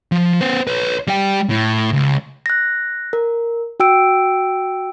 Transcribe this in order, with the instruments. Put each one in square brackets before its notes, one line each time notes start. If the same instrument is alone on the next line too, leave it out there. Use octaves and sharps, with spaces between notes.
[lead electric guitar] F3
B3 C5
B4 C#5
G3 G5
A2
C#2
[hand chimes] F#6 A#6
A#4
F#4 G5 E6 D7